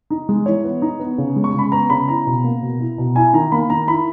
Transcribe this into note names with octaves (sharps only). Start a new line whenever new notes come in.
D#4
G#3
E3 C#5
B3
D#4
B3
C#3
G#3
C#6
C#3 B5
B3 A#5
C#3 B5
E4 A#5
B2
A#3
B2
E4
B2
E4 G#5
D#3 A#5
A#3 B5
D#3 A#5
E4 B5